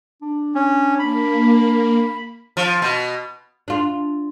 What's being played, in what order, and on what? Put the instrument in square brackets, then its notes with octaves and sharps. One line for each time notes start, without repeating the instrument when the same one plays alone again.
[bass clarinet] D4
[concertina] C#4
[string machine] A#3 [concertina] B5
[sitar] F3
B2
[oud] D4 F4